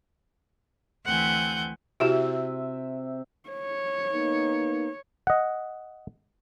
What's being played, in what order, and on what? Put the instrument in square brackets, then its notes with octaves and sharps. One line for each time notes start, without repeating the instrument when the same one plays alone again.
[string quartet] D2 E3 C4 F#5 G#5 G6
[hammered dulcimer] C3 C4 E5 [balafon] E4 F#4 G4
[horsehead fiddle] C#5
[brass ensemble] A#3 B3 D#4
[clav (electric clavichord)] D#5 F#5